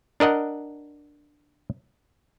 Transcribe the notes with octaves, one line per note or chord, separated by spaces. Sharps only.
D4 A#4 D#5 F#5